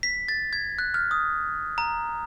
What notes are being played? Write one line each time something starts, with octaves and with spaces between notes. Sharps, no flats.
B6
A6
G#6
F#6
F6
D#6
A#5